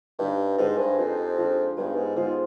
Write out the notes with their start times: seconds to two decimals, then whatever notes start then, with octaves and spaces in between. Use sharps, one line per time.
0.19 G2 D#4 G4 B4 D#5
0.58 G#2 D4 G#4 C5 D#5
0.78 G2
0.98 F2 D#4 G4 C5
1.38 G#3 D4 F4
1.77 G2 G3 B3 D#4 G#4
1.96 G#2
2.16 G#2 G#3 B3 F4 C5